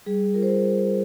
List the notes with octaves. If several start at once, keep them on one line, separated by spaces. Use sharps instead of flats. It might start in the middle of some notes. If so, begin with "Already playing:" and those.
G3 G#4
F4 A#4
C5